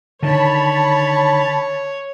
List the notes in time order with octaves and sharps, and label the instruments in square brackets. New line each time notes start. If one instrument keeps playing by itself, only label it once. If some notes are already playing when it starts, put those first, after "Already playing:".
[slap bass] D3 D#3 [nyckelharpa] C#5 [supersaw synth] A5 B5